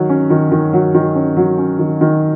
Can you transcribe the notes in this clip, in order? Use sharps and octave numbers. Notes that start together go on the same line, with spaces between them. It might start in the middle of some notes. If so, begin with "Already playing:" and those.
Already playing: D#3 F#3
C#4
D#3
D#3
F#3
D#3
C#4
F#3
C#4
D#3
D#3